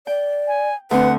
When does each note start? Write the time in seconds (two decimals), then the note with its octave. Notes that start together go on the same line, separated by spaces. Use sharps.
0.07 D5 G5
0.48 G#5
0.91 D2 C4 B4 F#5